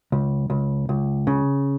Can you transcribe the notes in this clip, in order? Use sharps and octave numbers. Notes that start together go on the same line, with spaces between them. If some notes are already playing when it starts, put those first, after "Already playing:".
C#2
C#2
C#2
C#3